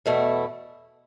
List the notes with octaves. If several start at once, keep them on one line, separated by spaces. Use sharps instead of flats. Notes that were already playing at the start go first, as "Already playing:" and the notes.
E2 B2 A3 E4